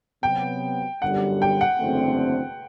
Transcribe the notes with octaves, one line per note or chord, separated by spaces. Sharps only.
C3 F#3 B3 G5
G1 F#2 D3 G3 F#5
G5
F#5
F#1 E2 D3 A3 C4